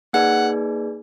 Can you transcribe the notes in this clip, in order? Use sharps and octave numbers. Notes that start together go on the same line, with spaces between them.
A#3 D#4 G#4 B4 D5 F#5